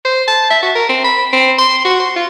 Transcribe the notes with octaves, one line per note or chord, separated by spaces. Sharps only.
C5
A5
E5
F#4
A#4
C4
B5
C4
C6
F#4
C6
F4